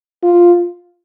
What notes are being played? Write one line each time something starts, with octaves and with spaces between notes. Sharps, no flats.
F4